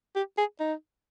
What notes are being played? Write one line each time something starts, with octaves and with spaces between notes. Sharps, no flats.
G4
G#4
D#4